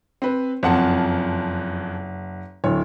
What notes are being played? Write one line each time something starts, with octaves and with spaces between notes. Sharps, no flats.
C4 B4
F#1 F2 F#5 A5
D1 C#5